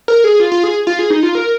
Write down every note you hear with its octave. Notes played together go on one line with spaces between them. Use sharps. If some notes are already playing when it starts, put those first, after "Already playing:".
A#4
G#4
F4
F4
G#4
F4
G#4
D#4
F4
A#4